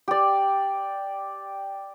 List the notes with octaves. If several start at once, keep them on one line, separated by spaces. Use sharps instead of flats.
G4 D5